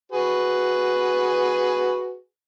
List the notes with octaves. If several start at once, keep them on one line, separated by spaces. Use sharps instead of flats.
F#4 G#4 B4